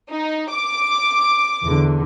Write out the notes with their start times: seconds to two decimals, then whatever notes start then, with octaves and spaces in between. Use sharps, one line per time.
0.10 D#4
0.51 D6
1.63 E2 D3